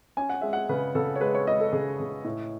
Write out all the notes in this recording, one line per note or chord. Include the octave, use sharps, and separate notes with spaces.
C#4 G#5
F#5
G#3 E5
F#5
C#3 B4
C#3 A4
C#5
G#3 B4
C#5
G#3 D#5
A4
C#3 G#4
C#3
A2